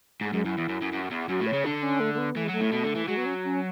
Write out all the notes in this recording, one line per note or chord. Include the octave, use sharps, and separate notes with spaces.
G#2 G#3
F#2 G#3
F#2 E4
E2
F#2
F#2
F#2
E2
F#2 F#4
A2
C#5
C#3
D3 D4
C#4
A3
A3
B3
E3 A3
G#3
F#3 A3
A2
B2
D3
E3
F#3 G#3
B3
C#4
C#4